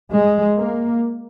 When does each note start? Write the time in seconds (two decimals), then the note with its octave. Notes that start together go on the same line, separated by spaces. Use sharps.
0.11 G#3
0.58 A#3